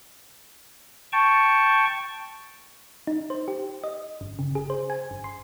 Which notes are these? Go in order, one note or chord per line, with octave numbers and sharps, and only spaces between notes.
G5 A5 C#6
D#4
C5
G4
D#5
G1
C#3
G#4
C5
G#5
G1
C6